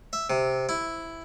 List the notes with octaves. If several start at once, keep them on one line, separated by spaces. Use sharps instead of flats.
E5
C3
E4